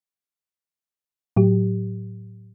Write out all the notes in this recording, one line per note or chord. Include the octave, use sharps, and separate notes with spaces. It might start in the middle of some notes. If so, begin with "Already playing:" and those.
A2 F#3 G4